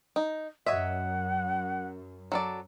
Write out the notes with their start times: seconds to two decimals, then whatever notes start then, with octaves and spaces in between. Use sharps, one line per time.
0.16 D#4
0.66 F#2 C#5 D#5 E5 F#5
2.32 F#3 A4 D5